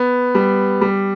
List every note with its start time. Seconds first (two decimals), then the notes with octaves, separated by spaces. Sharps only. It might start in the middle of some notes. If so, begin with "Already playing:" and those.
Already playing: B3
0.35 G3
0.81 G3